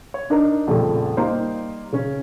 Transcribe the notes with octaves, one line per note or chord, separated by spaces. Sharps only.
C#5
D4 D#4 A#4
A#1 F2 C#3 G3 A3
G3 A#3 D#4 C5
C#3 C#4